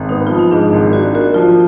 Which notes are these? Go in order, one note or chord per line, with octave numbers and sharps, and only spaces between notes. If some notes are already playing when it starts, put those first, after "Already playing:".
Already playing: G#1
B3 D#4
F3 F4
D#4
G#2 D4
G#1
D4 F#4
A#3 F#4
F3 F4